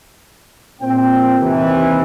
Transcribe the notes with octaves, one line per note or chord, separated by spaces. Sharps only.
A#2 C4 G5
D#2 C3 E3